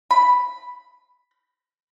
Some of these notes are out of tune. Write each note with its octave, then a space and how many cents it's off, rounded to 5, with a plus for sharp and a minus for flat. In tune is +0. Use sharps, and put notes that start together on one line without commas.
B5 +0